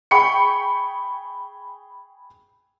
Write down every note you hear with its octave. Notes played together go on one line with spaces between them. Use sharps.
G#4 G5 B5 C#6 C#7